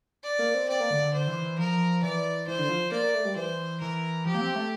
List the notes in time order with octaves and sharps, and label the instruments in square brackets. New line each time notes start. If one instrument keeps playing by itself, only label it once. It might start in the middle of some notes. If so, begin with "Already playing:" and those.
[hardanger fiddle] D5
[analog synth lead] A#3
C4
[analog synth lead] C4 [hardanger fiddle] D5
[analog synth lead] A#3
D3
D3
[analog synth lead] D3 [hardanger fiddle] C5
[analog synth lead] E3
E3
[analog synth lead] F3 [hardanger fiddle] A#4
[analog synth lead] E3 [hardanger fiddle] D5
[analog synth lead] E3 [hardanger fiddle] C5
[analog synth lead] D3
F3
[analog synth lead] A#3 [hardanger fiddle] D5
[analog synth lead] A#3
A3
G3
[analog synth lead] E3 [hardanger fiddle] C5
[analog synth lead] E3 [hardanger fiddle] A#4
[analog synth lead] F3 [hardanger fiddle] G4
[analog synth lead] A#3
C4
A3